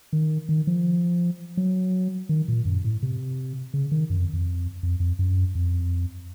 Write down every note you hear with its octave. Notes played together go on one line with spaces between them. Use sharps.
D#3
D#3
F3
F#3
D#3
A#2
F#2
A2
C3
C#3
D#3
F#2
F2
F2
F2
F2
F#2
F2